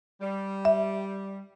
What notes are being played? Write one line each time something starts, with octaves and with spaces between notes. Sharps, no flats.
G3
E5